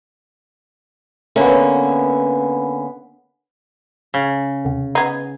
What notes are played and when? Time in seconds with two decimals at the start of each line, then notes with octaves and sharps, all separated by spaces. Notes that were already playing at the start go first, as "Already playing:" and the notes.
1.36 D3 A#3 B3 C#4 E5
4.14 C#3
4.65 D#2 C3
4.95 B3 D#4 G#6 C7